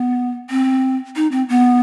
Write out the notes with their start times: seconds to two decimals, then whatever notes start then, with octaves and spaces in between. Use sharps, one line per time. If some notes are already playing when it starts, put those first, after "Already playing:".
Already playing: B3
0.50 C4
1.16 D#4
1.31 C4
1.49 B3